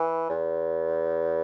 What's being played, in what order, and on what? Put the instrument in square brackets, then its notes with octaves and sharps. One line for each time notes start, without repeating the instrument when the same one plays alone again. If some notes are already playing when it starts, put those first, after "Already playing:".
Already playing: [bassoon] E3
E2